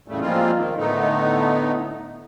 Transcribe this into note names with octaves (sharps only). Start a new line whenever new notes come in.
E2 A2 C#3 G3 A3
F3 G3 G#3 A#3 C4 F4
D#3
A2 D3 A3 B3 D#4